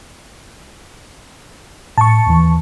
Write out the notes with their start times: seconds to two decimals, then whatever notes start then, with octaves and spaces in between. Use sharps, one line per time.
1.98 A2 A5 C#6
2.26 D#2 E3